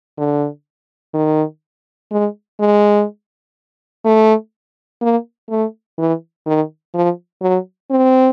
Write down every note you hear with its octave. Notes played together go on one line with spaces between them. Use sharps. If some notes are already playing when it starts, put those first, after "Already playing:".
D3
D#3
G#3
G#3
A3
A#3
A3
E3
D#3
F3
F#3
C4